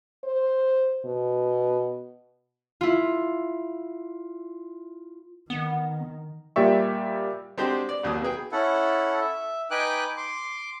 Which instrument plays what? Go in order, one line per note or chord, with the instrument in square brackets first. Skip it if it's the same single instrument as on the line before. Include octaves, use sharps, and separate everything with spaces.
[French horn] C5
B2
[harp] E4 F4
[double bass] D#3 [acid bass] B3
[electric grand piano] A#2 G3 G4 D5 E5 C#6
[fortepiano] G#3 C4 D4 F#4 G4 C5
D5
A#1 D#2 F#3 D#6
B2 B3 G#4 G5
[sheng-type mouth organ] C#4 E4 A4 F#5
E5
D#4 B4 G5 G#5 D6 F#6
C6 D6